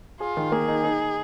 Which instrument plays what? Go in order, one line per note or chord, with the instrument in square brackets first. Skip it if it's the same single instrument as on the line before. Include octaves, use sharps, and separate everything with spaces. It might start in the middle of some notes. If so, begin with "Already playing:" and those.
[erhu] F4 [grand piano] G#4
[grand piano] D#3
[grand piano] A#3 [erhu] G#4
[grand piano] D#4
D#4